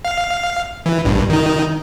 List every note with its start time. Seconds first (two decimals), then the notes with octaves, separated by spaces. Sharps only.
0.05 F5
0.86 E3
1.05 A#1 G2
1.30 D#3 D#4